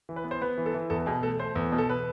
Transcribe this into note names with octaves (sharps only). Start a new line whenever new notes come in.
E3
B4
B3
C5
B3 B4
E3
A4
E3
E2 A4
B2 G#4
A3 A4
A3 C5
E2
B2
A4
B4